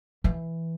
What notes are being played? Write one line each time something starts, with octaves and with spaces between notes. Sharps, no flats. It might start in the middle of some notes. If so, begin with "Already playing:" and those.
E3